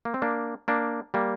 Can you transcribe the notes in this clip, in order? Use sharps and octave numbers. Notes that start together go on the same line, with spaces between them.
A#3
C4
A#3 D4
A#3 D4
G3 A#3